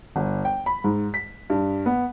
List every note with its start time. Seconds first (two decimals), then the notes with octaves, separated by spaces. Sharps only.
0.16 G1
0.45 G5
0.66 B5
0.84 G#2
1.14 B6
1.50 G2
1.86 B3